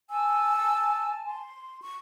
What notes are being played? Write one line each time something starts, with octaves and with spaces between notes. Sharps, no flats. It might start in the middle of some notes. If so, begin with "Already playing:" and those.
G#5 A5 E6
C6
C#6